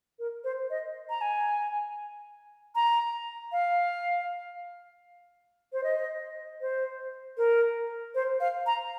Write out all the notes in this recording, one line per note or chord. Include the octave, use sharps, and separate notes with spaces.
A#4
C5
D#5
A#5
G#5
A#5
F5
C5
D#5
C5
A#4
C5
F5
A#5